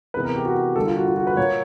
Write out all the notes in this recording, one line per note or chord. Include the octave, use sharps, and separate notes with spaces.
C3 E3 G#3 B3 B4
A#4
G4
F#4
D3 G3 A#3 A4
F4
F#4
F4
F#4
B4
A#2 F#3 A#3 C#5